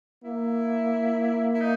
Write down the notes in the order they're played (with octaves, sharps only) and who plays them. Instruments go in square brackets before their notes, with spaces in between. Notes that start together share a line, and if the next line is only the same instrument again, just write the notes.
[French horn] A#3 [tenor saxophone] E4
[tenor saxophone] E4
D#4